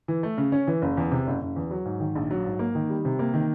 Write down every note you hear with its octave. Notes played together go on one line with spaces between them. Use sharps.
E3
A3
C#3
C#4
E3
F#1
E2
C3
F#1
F#1
E2
F#3
G#2
D#3
A#1
F#3
G#2
A#3
D#3
G3
C3
A#3
D#3